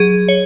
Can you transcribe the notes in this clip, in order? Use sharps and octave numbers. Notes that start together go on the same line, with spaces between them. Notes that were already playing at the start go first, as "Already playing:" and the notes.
Already playing: F#3 G#4
C#5